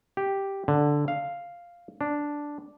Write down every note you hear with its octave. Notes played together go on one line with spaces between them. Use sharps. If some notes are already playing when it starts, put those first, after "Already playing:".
G4
D3
F5
D4